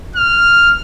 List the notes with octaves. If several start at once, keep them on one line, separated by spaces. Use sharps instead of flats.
F6